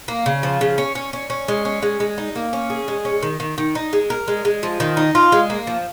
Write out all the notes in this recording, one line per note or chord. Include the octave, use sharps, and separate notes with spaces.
A#3
C#3
F3
C#3
C#4
C#4
C#4
C#4
G#3
C#4
G#3
G#3
D#4
A#3
C#4
G#4
G#3
C#4
D#3
D#3
D#3
D#4
G#3
A#4
G#3
G#3
F3
D#3
D#4
F4
G#3
A#3
F3